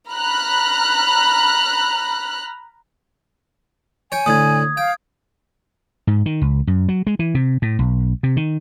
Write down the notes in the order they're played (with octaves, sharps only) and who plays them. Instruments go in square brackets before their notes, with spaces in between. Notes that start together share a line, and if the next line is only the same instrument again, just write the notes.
[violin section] A#5 B5 F6 F#6
[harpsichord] C#5 G5 [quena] G#5
[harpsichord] A2 D3 [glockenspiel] D#6 G#6
[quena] F5 [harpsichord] G5
[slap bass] G#2
D#3
C#2
F#2
F#3
G#3
E3
C3
A2
B1
C3
D#3